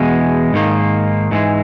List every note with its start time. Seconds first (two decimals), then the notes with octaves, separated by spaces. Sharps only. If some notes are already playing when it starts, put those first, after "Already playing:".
Already playing: E2 B2 G#3
0.53 G#2 D#3 A#3
1.31 G#2 E3 G#3